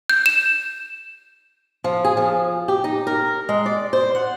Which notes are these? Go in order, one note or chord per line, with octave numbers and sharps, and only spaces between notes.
G6
E7
F3
G#4
F3
G4
D#4
A#4
G#3
D5
C5
F#5